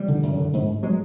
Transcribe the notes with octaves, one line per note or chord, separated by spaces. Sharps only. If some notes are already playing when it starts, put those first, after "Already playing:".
Already playing: F3 G3
D3
F#2
D3
G#2
F#3 G#3